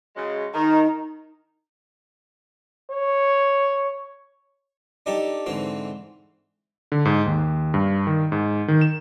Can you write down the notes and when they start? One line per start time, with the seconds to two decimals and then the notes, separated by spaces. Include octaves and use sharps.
0.16 C#3 F#3 G#3
0.54 D#3 D#4 A#4
2.90 C#5
5.06 D4 D#4 G4 A4
5.46 G#2 D3 E3 C4
6.92 D3
7.05 G#2
7.26 D#2
7.74 G2
8.07 D#3
8.32 G#2
8.68 D#3
8.81 E7